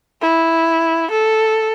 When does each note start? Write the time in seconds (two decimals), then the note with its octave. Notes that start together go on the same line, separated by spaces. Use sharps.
0.22 E4
1.11 A4